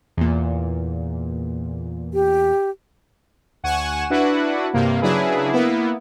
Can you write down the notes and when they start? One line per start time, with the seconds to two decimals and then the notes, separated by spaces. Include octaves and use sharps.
0.17 E2 A#2
2.14 G4
3.63 D2 F#5 G#5 C#6 E7
4.10 D4 E4 F#4 B4 F#5
4.74 G2 C3 A#3
5.02 C#3 F#3 D4 E4 G#4 B4
5.52 A#3 B3 E4